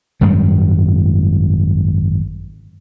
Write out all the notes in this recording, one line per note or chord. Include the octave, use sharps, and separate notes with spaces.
G#1 F#2 G3 G#3